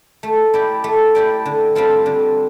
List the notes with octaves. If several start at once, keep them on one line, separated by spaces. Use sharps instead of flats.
A3
E4 G4 D5
A3
E4 G4 D5
D3
G3 C4 F4 A4
D3